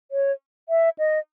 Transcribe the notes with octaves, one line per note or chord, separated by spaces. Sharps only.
C#5
E5
D#5